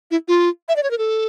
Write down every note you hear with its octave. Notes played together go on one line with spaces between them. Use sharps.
E4
F4
E5
D5
C#5
A#4
A4